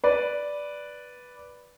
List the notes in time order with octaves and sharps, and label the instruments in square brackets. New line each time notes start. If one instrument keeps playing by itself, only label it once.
[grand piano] B4 D5